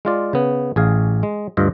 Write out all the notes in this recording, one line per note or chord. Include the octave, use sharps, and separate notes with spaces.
G#3 F4 D5
C#3 B3
A1 G#4 F5
G#3
D2 G2 F4 D#5